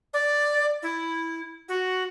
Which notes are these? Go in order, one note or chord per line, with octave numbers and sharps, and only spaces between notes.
D5
E4
F#4